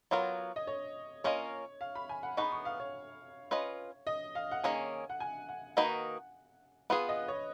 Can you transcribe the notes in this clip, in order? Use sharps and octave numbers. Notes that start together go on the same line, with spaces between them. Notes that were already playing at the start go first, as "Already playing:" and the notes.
F#3 B3 F4 A#4 C#5
D#5
C#5
A#3 C#4 F4 A#4 C#5 D#5
F5
B5
G#5
F#5
B3 D#4 G#4 B4 C#6
C#6
F5
C#5
C#4 F4 B4 D#5
D#5
F5
F#5
D#3 A#3 C#4 G#4 G#5
F#5
G#5
F#5
D#3 A#3 D#4 F#4 B4
B3 F4 G#4 B4
D#5
C#5